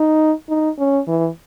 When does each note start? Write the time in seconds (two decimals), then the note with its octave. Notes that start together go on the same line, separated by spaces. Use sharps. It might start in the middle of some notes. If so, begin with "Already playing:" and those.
Already playing: D#4
0.49 D#4
0.79 C#4
1.08 E3